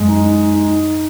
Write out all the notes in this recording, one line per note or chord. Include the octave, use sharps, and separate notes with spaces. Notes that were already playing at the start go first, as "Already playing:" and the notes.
Already playing: F#2 G#3
D#4
D#4